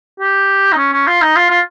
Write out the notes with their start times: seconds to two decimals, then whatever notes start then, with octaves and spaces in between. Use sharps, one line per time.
0.20 G4
0.73 D#4
0.77 C#4
0.93 C#4
1.07 F4
1.22 D#4
1.36 F4
1.50 F4